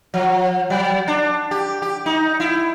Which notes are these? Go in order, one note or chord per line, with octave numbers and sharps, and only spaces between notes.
F3
F#3
D4
G4
G4
D#4
E4